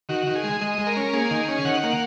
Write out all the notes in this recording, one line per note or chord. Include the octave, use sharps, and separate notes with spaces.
D#3 F#4
D#3
G#4
G#3
G#3 D#5
G#3
A#4
C#4
A#3 G#4
D#3
C#4
D#3 F#5
A#3